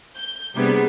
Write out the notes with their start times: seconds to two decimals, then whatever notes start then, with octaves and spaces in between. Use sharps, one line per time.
0.17 G6
0.56 C3 G3 A#3 B3 D4 G#4